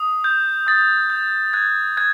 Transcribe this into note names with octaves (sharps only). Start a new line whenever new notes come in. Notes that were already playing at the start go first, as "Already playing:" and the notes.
Already playing: D#6
G6
D#6 A6
G6
F#6 G#6
F#6 G#6